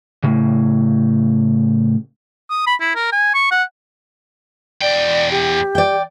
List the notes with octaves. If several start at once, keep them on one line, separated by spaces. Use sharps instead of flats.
A2 C#3
D#6
B5
E4
A#4
G#5
C#6
F#5
E2 D5 G5
G4
D5 G5